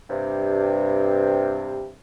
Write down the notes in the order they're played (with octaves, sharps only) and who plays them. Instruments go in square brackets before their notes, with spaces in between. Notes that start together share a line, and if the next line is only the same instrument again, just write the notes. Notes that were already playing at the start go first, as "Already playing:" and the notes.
[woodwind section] G2 C3